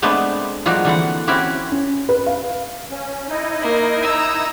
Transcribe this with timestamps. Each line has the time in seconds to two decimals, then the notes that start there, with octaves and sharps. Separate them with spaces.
0.02 G#3 A3 B3 C4 D4 B4
0.66 F3 G3 G#3 A#3 F#4
0.85 D3 E3 C4 F#5
1.28 C4 C#4 E4 F#4 G4
1.72 C#4
2.09 B4
2.26 F5
2.91 C#4
3.29 D#4 E4 D#5
3.61 A#3
4.03 A#5 E6